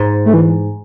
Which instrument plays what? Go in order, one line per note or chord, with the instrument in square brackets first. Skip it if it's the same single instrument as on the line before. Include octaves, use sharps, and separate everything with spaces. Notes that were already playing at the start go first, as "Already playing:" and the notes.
Already playing: [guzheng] G#2
[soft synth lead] A3
E3